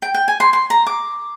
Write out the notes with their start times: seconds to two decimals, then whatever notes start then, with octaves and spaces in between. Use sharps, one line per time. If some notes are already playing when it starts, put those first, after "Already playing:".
0.02 G5
0.14 G5
0.28 G#5
0.40 C6
0.53 C6
0.70 A#5
0.86 D6